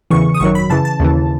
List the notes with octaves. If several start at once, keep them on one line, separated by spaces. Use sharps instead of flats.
E2 C#3 E3 C#6
D#6
G#1 F#2 D#3 F#3 C#6
B5
F#2 C#3 E3 A5
A5
D#2 C#3 E3